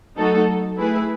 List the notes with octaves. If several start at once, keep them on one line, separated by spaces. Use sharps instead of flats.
F#3 A3 D#4 F#4 A4
A3 E4 G#4 B4